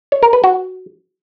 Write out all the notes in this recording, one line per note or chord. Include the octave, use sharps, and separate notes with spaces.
C#5
A#4
B4
F#4